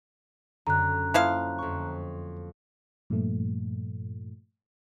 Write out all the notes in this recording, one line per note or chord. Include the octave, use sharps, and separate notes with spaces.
F#2 D3 A#5 F#6
F3 A#3 E4 F5
F2 C#6
G2 A#2 F3 A3